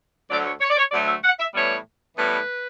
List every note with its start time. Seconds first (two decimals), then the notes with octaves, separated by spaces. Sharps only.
0.30 D2 D3 F#3 A3 D5
0.46 C#5
0.61 C#5
0.70 D5
0.77 C#5
0.92 D2 D3 F#3 A3 D5
1.07 E5
1.24 F#5
1.39 E5
1.55 A2 E3 G3 B3 C#5
2.17 A2 E3 G3 B3 B4